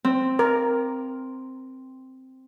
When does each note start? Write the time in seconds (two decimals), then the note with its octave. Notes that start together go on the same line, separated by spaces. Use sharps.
0.04 C4
0.39 A#4